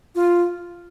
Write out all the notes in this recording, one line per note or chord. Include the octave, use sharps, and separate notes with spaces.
F4